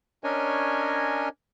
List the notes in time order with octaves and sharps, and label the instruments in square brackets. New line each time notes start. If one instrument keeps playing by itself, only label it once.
[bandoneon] C#4 D4 A#4 C#5 D#5 G#5